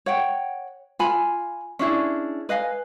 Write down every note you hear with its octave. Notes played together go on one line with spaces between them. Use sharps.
C#5 F#5 G5
F4 G#5 B5
C#4 D4 E4 G#4
B4 D#5 F5 G#5